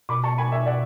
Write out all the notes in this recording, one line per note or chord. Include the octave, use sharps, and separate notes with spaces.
B2 B5 D6
A5 C#6
G#5 B5
E5 G#5
D5 F#5